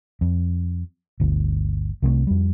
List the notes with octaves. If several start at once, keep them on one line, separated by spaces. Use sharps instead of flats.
F2
G1 D2
C2 C3 E3 A3
F2 G3